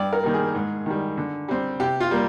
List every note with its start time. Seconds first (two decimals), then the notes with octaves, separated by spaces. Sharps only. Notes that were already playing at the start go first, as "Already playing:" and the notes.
Already playing: G2 D5
0.13 A#4
0.23 D#3 G3 A#3
0.34 G#4
0.55 G#2
0.86 D#3 G3
1.17 D3
1.48 G3 C4
1.80 C3 G4
2.00 F4
2.11 G3 A#3